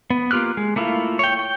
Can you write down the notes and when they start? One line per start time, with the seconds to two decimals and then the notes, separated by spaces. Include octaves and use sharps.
0.10 B3
0.31 A#3 F4 G4 F6 F#6
0.57 G#3
0.76 A3 A#3 E4 F4
1.19 C#5 G5
1.39 G5